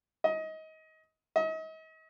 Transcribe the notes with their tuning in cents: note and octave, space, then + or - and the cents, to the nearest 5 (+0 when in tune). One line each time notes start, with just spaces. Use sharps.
D#5 +25
D#5 +40